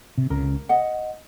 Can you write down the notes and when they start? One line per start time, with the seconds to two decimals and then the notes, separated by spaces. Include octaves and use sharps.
0.18 C3
0.30 C#2 C#3 A#4
0.69 D#5 F#5